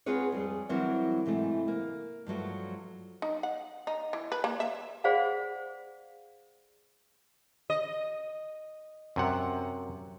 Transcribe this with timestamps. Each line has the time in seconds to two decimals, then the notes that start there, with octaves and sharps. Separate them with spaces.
0.06 B3 C4 F4 G#4 B4 C#5
0.32 F2 G3 G#4
0.69 E3 F#3 G3 C4 A#4 C#5
1.26 G#2 C3 E3 A3
1.68 A#3
2.26 G2 F3 F#3 A3
3.22 D#4
3.43 F#5
3.87 D#4
4.13 E3
4.32 B4
4.44 A#3
4.60 E5
5.04 G#4 C5 D5 F5 F#5
7.70 D#5
9.16 F#2 C3 F#5